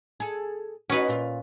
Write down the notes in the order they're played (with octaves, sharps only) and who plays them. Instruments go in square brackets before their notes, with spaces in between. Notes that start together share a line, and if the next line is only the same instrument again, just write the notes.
[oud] G#4 A4
[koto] C#4 B4 [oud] D#4 F#4
[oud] A#2 F4